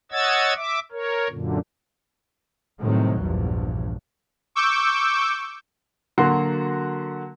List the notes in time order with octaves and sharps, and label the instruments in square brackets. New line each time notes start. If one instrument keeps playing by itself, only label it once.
[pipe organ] C#5 D#5 F#5 E6 G#6 A6
E5 D6
A#4 C#5
F#2 A#2 D3
[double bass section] A2 C3 D#3 F#3 G3
A#1 E2 G2
[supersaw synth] C#6 D6 E6 G6
[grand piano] D3 F#3 A#3 F#4 C6